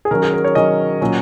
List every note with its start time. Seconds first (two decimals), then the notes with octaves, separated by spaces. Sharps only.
0.05 G#4
0.11 D#3 F#3 C#4 A#4
0.22 G#4
0.33 A#4
0.44 C#5
0.55 D#3 F#3 C#4 D#5
1.01 A#2 F#3 C#4